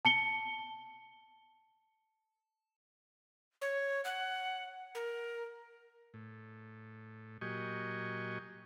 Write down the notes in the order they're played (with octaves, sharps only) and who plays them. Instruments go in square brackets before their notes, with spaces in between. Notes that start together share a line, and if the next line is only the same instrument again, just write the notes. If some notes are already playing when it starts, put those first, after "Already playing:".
[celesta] A5 C#7 G7
[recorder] C#5
F#5
A#4
[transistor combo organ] A2
A#2 F#3 G4 D#5 G#5 C#6